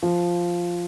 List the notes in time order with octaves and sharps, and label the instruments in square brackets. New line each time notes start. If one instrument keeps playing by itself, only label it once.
[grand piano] F3